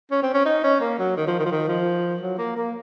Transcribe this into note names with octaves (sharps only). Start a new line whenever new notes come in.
C#4
C4
C#4
D#4
C#4
A#3
F#3
D#3
F3
D#3
F3
D#3
F3
F#3
A#3
A#3